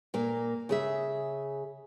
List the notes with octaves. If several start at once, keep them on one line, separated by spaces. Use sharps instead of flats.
A#2 A#3
C#3 G#4 E5